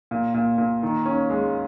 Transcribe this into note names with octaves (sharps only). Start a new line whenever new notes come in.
A#2
A#2
A#2
D#3
C#4
G#3